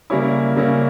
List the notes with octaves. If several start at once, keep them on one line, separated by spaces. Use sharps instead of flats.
C#3 G3 A#3 C#4 E4
C#3 G3 A#3 C#4 E4